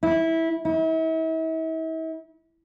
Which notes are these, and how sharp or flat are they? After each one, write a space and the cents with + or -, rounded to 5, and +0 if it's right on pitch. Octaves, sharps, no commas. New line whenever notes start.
E4 -15
E4 -40